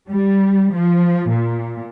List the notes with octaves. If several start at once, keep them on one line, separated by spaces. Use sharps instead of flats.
G3
F3
A#2